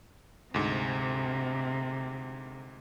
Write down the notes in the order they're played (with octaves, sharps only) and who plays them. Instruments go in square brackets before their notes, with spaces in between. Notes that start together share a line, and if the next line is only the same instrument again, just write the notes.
[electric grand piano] D2 G#2 [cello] C3